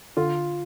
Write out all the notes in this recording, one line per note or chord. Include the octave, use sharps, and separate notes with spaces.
D3 F4